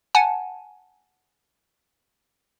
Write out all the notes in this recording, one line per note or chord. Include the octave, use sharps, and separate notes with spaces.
F#5 G#5 A5